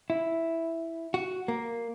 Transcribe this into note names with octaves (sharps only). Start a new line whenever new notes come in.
E4
F#4
A#3